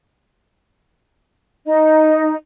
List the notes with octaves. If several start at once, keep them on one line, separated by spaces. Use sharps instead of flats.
D#4 D#5